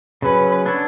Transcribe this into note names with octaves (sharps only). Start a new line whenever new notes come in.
C#3 F#3 C#4 B4
B3 D4 A4 C#5